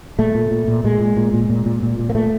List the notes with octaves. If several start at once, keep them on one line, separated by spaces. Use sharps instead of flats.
A#2 A3
A#2
A#2
A#2
A#2 G#3
A#2
A#2
A#2
A#2
A#2
A#2
A#2
A#3
A#2 A3